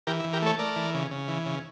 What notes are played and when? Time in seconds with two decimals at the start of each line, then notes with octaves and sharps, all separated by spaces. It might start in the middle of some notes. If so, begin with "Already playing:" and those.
0.07 E3 G4 A#4
0.20 E4
0.24 E3
0.33 G4 A#4
0.42 A3 A4 C#5
0.59 A3 A#4 D5
0.76 E3
0.94 C#3
1.11 C#3
1.28 E3
1.46 C#3